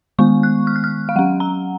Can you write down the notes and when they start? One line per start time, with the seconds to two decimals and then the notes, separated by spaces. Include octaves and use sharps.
0.19 D#3 G#3 B3 C#6
0.43 F#6
0.67 F6
0.76 F#6
0.84 F6
1.09 F5
1.16 F#3 C#4 F#5
1.40 A#5